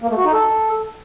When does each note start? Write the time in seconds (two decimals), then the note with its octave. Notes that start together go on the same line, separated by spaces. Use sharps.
0.02 A#3
0.10 A3
0.18 F#4
0.25 D#4
0.33 A4